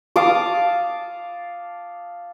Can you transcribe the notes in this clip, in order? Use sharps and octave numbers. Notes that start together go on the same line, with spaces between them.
F5 A5 D6 D#6